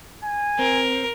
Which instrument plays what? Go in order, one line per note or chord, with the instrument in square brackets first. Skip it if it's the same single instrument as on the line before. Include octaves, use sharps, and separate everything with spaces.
[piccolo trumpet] G#5
[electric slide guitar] C4 [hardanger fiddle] A#4